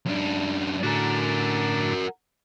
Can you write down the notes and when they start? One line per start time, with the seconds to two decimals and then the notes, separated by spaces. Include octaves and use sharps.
0.05 F#2 D4
0.83 A2 D3 D4 F#4 A#4